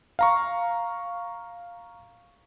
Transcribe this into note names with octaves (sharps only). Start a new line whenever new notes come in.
F5 A#5 C#6